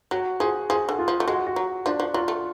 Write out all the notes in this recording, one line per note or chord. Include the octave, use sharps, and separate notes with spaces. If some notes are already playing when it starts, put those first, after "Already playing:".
F#3 F#4
F3 G#4
F3 G#4
D3
F4
F3
A3
G#3 F#4
F#4
F#3
F3 D4
F3
F#3 F4
A3